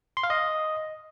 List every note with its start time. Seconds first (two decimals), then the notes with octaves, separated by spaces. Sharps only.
0.17 C6
0.23 F5
0.30 D#5